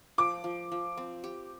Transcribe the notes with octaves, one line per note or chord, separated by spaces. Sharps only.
F3 D6
F3
F3
C4
G4